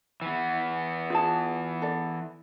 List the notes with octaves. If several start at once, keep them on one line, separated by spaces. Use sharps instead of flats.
E3 B3
F4 G#4 A5
A4 D5